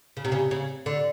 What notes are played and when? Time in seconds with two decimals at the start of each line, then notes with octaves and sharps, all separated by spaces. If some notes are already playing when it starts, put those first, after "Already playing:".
0.17 C#3
0.25 C3
0.32 C#3
0.51 C#3
0.86 D3